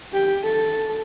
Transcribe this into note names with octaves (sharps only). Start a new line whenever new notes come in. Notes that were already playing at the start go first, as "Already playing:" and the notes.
G4
A4